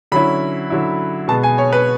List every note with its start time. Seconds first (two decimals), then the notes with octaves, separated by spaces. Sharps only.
0.12 D3 F#3 C#4 E4 B5
0.70 D3 F#3 C#4 E4
1.28 B2 G#3 B3 A5
1.43 G#5
1.58 C#5
1.73 B4